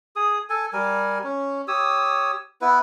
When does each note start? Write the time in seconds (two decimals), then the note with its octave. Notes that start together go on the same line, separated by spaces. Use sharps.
0.16 G#4 D#6
0.50 A4 G#5
0.73 G3 A#4 G#5
1.24 C#4
1.68 G4 C#5 D#6 E6
2.61 B3 E4 B4